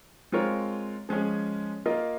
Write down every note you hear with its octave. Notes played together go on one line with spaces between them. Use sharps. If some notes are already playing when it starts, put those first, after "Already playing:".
G#3 C4 F4 A#4 C#5
F3 G#3 C#4 G#4
A#3 F4 A#4 D#5